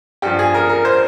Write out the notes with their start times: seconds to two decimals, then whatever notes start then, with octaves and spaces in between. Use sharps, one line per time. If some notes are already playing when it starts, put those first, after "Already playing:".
0.22 G2 F3 G4
0.39 G#4
0.54 A#4
0.69 A#4
0.85 C5